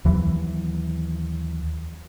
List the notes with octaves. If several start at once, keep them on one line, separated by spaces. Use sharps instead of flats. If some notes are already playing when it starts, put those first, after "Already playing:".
D#2 E3 F#3